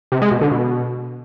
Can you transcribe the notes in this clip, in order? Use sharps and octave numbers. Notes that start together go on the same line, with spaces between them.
C3
G#3
B2
D3
B2